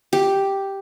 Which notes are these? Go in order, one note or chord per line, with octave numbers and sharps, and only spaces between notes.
G4